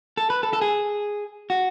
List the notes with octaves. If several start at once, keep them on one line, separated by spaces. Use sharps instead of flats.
A4
B4
A4
A4
G#4
F#4